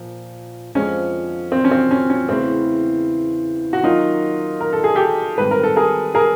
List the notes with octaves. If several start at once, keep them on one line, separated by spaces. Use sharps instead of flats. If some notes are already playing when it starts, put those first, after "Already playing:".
Already playing: A#2 F3
F2 D3 F3 G#3 C#4
C4
C#4
C4
C#4
C#4
E2 C#3 E3 A3 C4
F#4
D#3 F#3 A#3 C#4 D#4 F4
A#4
A4
G#4
G4 A4
G#2 D#3 G3 C4 B4
A#4
A4
G#4 A#4
G#4 A#4